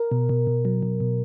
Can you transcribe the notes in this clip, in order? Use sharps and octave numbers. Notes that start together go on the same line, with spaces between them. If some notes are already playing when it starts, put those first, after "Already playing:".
Already playing: A#4
B2
B2
B2
F#3
B2
B2